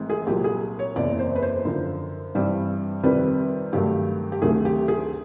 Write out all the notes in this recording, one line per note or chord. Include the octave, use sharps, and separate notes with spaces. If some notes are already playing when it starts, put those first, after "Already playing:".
Already playing: G#1 G#2 E3 A3 C4
G#4
C2 A#2 F#3 G4
G#4
C#5
F#1 E2 C3 D5
C5
B4
C5
F#2 D3 F3
G2 E3 G3 C4
F2 C3 D#3 G3 C4 B4
G2 D#3 F#3 A3 G4
G4
D2 C3 D#3 F#3 A3 G#4
G4
G#4